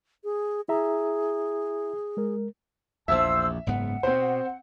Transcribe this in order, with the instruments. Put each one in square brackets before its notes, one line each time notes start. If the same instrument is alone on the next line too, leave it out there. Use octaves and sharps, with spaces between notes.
[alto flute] G#4
[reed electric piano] E4 E5 A#5 [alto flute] G#4
[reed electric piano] G#3 A#4
[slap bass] A#1 E2 [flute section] C5 A5 E6 [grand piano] E5
[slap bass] F#1 G#2 B3 [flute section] F#5
[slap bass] B2 [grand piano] C4 C5